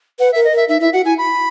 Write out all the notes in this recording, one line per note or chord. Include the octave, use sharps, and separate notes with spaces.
B4 F#5
E5
A#4
D#5
A#4 E5
D#4 E5
E4 E5
F#4 F#5
E4 G#5
B5